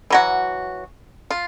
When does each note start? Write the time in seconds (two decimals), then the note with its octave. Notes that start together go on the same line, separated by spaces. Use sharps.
0.10 E3 F#3 F#4
1.31 F4